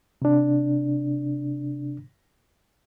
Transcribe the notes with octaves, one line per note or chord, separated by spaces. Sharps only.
C3 D4